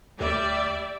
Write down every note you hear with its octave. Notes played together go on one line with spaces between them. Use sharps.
D2 G3 D5 E5